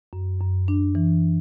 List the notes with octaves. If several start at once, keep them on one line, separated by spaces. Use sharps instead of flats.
F#2
F#2
D4
E3